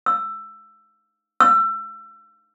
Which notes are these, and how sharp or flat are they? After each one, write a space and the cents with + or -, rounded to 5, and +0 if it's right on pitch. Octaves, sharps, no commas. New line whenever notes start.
E6 +15
E6 +30